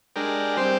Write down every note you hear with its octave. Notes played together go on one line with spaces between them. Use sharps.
G#3 D4 G4 A#4
G3 C4 G4 C5